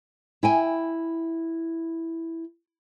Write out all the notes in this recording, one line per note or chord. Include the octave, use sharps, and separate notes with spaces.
E4 G5 G#5